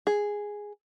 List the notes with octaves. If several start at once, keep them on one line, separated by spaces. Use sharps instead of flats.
G#4